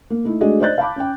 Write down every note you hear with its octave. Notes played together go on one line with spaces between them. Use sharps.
A#3
A3 D#4 E4
G#3 A3 D4 F#4 G#4 D#5
C5 D5 D#5 F#6 G6 A6
F5 A5 B5 D6
C#4 G5